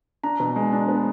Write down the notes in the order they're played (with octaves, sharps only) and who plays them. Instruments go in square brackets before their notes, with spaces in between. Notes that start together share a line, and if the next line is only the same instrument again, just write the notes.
[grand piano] D4 A#5
B2
G#3
D4
B3